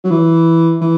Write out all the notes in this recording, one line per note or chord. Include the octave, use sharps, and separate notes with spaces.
F#3
E3
E3